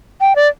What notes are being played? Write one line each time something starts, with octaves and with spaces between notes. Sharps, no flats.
G5
D5